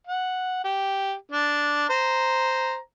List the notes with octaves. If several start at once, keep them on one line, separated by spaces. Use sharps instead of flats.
F#5
G4
D4
C5 A#5